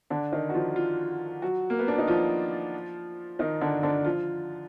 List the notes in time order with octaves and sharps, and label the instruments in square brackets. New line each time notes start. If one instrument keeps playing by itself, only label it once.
[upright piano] D3 D4
D#3 D#4
F#4
F3 F4
F3 F4
F#3 F#4
A#3
B3
D4
D#4
F3 F4
D#3 D#4
D3 D4
D3 D4
F3 F4